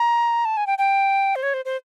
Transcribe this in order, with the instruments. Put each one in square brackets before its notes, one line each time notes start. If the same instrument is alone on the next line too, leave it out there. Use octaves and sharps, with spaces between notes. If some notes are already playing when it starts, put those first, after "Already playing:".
Already playing: [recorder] A#5
A5
G#5
G5
G5
C5
C#5
C5
C5